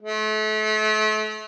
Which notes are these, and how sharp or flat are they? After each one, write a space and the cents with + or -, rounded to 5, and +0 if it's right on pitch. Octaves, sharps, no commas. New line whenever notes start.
A3 -35